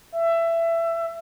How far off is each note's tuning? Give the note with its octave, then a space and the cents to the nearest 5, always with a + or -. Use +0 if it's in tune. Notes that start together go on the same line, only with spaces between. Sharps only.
E5 +20